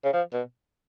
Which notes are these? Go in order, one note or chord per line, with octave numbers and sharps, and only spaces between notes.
C#3
F3
B2